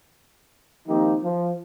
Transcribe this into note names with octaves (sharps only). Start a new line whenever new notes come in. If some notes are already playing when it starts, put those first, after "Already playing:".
D#3 F3 A#3 C4 D#4 G4
F3